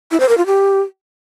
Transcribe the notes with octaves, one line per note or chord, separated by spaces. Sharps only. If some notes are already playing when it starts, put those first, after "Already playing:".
E4
C5
A#4
F4
G4